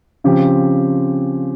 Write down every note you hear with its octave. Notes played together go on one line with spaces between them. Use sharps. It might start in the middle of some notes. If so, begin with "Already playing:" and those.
C#3 F3 C4 G4